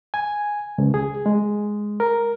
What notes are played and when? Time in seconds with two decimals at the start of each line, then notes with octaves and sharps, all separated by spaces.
0.14 G#5
0.78 C#2
0.94 G#4
1.26 G#3
2.00 A#4